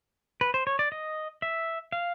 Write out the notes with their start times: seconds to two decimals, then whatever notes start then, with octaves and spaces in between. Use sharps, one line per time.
0.41 B4
0.54 C5
0.67 C#5
0.79 D5
0.92 D#5
1.42 E5
1.92 F5